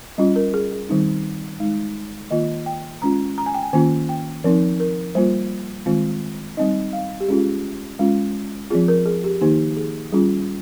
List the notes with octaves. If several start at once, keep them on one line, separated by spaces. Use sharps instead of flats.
G3 C#4 F4 D#5
A#4
G#4
G#4
D#3 G3 C4 D#4
G#3 D#4
D#3 A#3 F4 D#5
G5
G#3 C#4 F4 A#5
A#5
G#5
G5
G#5
D#3 A#3 C#4 F4 G#5
G5
F3 C4 D#4 A#4
A#4
G3 A#3 F4 C5
D#3 G#3 C4 F4
G3 C4 D#4 D#5
F5
G4
G#3 C#4 F4 G#4
G#3 C#4 F4
F3 C4 F4 G#4
A#4
G#4
G4
D#3 A#3 D#4 G4
G#4
G3 C#4 F4 G#4